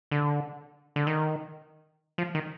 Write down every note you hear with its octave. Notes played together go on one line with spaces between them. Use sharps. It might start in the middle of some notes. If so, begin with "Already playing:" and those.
D3
D3
D#3
F3
D#3